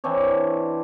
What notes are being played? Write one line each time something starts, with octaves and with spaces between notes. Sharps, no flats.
E3 C4 D4 C#5